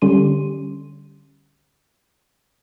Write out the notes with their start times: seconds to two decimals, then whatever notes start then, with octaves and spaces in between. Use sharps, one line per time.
0.02 D3 G3 C#4 G4 C6 D#7